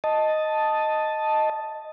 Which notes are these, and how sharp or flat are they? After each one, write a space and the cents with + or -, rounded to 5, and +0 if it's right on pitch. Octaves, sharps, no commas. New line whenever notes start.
D#5 +0 A5 +0